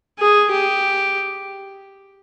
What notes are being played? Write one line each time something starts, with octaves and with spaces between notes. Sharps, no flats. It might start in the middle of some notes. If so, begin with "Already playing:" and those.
G#4
G4